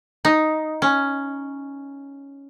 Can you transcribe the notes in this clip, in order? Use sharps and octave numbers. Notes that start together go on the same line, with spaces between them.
D#4
C#4